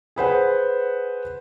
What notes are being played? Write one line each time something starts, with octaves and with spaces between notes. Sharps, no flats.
G#4 B4 C5 F#5